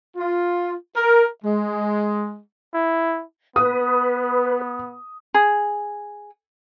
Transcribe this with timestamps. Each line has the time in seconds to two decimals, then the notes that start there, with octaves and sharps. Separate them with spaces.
0.17 F4
0.96 A#4
1.44 G#3
2.74 E4
3.56 B3 B4 D#6
5.34 G#4